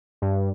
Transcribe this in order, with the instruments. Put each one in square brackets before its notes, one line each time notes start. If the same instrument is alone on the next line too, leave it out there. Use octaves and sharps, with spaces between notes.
[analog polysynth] G2